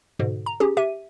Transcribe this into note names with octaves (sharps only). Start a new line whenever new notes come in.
G#2 B2 D3
A#5
C#4 G4 G#4
G4 E5 D#7